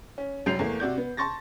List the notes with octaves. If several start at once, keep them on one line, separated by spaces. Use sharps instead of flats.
C#4
F1 F#2 F#3 G6 C7 F7
E2 A3 A#3
C3 F#4 D5 G6
B3
A5 C6 C#6 A6 A#6